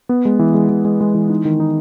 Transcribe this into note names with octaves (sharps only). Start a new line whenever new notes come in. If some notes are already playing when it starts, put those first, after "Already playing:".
B3
G#3
E3
G#3
E3
G#3
G#3
E3
D#4
D#3
D#4